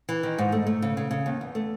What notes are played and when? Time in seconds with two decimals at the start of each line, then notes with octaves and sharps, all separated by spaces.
0.09 E3
0.23 D#3
0.38 G#2
0.52 A3
0.67 A3
0.82 C#3
0.97 C#3
1.11 C#3
1.26 D#2
1.41 E2
1.55 A3